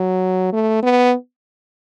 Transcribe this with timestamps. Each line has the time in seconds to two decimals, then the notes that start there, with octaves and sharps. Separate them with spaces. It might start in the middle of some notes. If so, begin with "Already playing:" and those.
Already playing: F#3
0.53 A3
0.83 B3